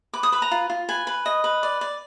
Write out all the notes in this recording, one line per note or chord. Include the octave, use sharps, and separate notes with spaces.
B4 D6
D#6
B4 B5
A#5
F4
F4
B4 G#5
B4
D#5
B4
D5
D5